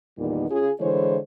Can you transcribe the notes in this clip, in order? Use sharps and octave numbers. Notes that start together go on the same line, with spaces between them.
E2 A#2 D#3 G3 B3 D#4
C#3 F4 G#4
D3 E3 G#3 E4 C5 C#5